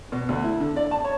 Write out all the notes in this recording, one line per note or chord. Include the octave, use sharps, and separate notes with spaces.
B2
D2
E4
D3
D5
A5
C#5